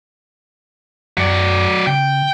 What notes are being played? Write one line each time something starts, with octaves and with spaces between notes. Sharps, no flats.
F#2 F#3 D5
C#3 G5